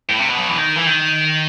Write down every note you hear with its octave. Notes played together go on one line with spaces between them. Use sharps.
A2
C3
B2
F#3
E3
D#3
E3
D#3